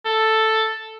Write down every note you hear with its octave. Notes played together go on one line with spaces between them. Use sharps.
A4